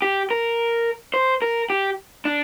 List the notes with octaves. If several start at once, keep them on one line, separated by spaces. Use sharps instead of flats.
G4
A#4
C5
A#4
G4
D4